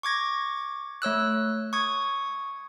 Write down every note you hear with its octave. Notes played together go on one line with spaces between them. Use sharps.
C#6 D6 G#6 A#6
A3 C#5 E6 F#6
C#6 D#6 G#6